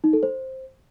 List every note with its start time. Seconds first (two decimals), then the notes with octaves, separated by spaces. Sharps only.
0.04 D#4
0.13 A4
0.23 C5